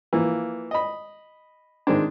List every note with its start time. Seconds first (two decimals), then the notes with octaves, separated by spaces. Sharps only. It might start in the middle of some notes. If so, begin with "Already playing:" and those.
0.13 E3 F3 A#3
0.71 D#5 B5
1.87 D#3 G#3 C4 D4